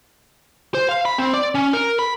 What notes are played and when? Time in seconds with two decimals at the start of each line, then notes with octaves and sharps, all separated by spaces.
0.75 C5
0.89 F5
1.05 B5
1.18 C4
1.34 D5
1.55 C#4
1.73 A#4
1.99 B5